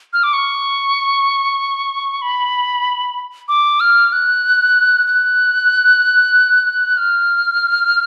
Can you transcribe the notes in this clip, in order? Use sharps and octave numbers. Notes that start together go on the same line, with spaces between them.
F6
D6
C#6
B5
D6
F6
F#6
F#6
F6